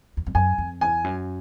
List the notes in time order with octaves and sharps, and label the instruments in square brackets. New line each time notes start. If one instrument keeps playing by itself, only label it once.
[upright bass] E2
F2
[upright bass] F#2 [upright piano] G#5
[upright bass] F2
[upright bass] E2 [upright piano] G#5
[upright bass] F#2